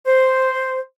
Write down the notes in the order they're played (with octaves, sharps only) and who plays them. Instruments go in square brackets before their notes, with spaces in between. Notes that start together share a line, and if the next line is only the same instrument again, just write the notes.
[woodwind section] C5